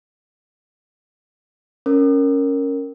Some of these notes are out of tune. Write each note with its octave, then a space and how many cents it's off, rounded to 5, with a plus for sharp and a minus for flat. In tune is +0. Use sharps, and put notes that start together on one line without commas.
C#4 +0 A#4 -10